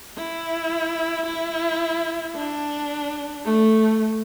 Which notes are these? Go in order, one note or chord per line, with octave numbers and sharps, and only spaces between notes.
E4
E4
D4
A3